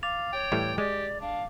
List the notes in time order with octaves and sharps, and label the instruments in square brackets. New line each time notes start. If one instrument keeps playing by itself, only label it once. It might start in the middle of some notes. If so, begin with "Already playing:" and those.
[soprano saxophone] F5 [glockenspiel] D6 A6 F7
[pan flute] C#5 [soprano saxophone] G5 [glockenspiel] A6
[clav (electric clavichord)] A2 E3 G3
[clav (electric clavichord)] G#3 [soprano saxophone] G4 [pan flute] D5
[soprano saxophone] D4 [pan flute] F5